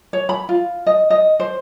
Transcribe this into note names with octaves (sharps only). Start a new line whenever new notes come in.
C#5
B5
F4
D#5
D#5
C5